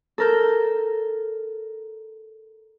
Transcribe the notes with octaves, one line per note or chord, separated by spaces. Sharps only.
A4 A#4 G6